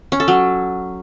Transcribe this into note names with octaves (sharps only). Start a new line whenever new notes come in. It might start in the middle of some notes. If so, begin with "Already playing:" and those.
C#4
A4
F#3